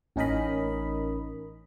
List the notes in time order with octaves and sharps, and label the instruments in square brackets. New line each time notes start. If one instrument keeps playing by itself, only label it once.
[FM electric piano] A1 C#4 D#4 A#4 D#5 B5